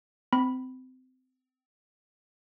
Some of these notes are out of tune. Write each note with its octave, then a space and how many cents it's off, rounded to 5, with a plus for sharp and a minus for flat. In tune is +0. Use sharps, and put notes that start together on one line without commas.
C4 -25 B5 +0